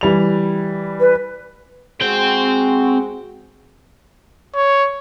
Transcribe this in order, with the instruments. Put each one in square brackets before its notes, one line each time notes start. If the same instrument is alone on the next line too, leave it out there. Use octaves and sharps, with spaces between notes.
[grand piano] E3 G3 F7
[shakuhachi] B4
[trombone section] G#3 F#4 [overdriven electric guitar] C4 G5
[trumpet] C#5